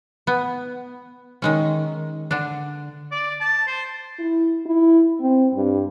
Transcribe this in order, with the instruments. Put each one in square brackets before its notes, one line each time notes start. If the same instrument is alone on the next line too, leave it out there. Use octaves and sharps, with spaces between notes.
[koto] B3
D#3 G#3 C#4
D3 D4
[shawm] D5
A5
C5
[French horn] E4
E4
C4
G2